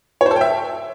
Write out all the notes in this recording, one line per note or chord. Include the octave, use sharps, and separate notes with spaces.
C#5
C5
A4
G5
E5